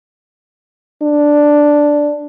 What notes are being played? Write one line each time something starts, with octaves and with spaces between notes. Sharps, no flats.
D4